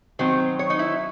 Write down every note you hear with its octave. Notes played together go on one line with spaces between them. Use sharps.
D#3 F#3 C4 C5
C#5
D#4
E4